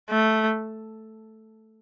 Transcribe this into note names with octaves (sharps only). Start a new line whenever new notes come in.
A3